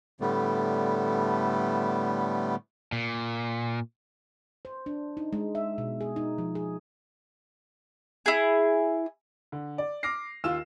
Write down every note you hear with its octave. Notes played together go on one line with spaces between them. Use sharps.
A2 D3 G3 A3 B3
A#2
C5
D4
D#4
G#3
E5
B2
G#4
D#4
F3
G#4
E4 G#4
D3
D5
D6 F6 A#6 C7
D#2 F4 E6 E7